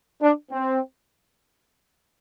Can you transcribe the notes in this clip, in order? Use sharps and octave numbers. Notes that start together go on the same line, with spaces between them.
D4
C4